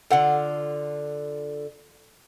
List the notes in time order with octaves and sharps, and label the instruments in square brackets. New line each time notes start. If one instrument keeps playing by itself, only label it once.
[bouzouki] D3 F4 [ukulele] A4 F#5